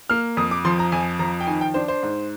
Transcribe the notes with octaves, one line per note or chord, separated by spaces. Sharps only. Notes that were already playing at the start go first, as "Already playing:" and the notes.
A#3 F6
F2 D#6
D6
F3 C6
A#5
F2 G#5
F3 A#5
G5
D#3 G#5
G5
D4 C5
C5
G#2